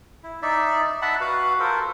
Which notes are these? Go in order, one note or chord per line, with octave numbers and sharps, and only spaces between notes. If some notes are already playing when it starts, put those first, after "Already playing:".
E4
D#4 D5 E5
E5 F#5 A5 B5
F#4 B4 F5
F4 A4 A#4 C5